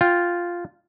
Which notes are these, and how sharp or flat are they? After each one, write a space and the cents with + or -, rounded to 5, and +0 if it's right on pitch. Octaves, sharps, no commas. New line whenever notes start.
F4 +0 G5 +0